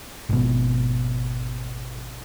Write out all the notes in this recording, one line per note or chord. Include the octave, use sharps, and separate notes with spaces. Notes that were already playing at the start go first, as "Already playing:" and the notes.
G#1 B2